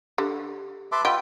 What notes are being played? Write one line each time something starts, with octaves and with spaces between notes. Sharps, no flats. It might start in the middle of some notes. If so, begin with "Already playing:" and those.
D3 G4
B4 E5 A5 C6 D6
F4 G4 B4 D#5 F#5 E6